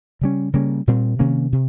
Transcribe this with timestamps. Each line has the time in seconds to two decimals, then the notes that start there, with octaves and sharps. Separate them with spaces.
0.21 C#3 G3 C#4
0.53 C#3 G3 A#3 C#4
0.87 A#2 G3 C4
1.19 C3 D#3 A#3 C#4
1.52 C3